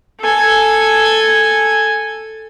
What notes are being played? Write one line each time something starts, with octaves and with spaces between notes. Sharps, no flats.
A4 G#5